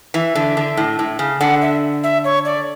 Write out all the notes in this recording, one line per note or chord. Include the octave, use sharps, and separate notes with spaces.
E3 E5
D3
D3
A2
A2
C#3
D3 F#5
E5
E5
C#5
D5